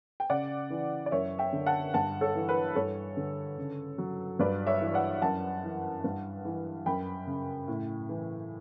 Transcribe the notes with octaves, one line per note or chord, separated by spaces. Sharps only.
G5
C#3 D5 F#5
E3
D5
F#2 C#5 E5
E5 G5
D3
F#5 A5
G2 F#5 A5
A4 C#5
E3
B4
G2 A4 C#5
D3
C#3
F#3
G2 B4 D5
C#5 E5
E3
D5 F#5
F#2 F#5 A5
E3
G2
E3
F#2 G5 B5
C#3
A2
E3